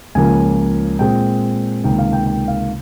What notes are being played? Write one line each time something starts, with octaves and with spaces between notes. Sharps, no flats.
C#2 C#3 F3 A#3 G#5
A#2 G#3 C4 G5
C#2 C3 D#3 A#3 G5
F5
G5
G5
F5